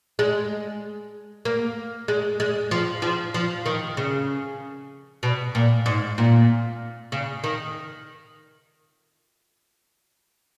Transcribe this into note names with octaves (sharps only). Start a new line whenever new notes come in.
G#3
A#3
G#3
G#3
F3
F3
F3
D#3
C#3
B2
A#2
G#2
A#2
C#3
D#3